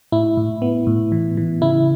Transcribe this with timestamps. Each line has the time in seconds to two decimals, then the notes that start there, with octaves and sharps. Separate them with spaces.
0.12 A2 E4
0.37 A2
0.62 B3
0.87 A2
1.12 E3
1.37 E3
1.62 C#3 E4